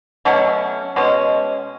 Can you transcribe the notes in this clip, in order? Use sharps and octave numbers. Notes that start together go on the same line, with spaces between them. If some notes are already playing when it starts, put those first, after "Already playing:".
B2 F#3 A3 C#4
B2 G#3 C#4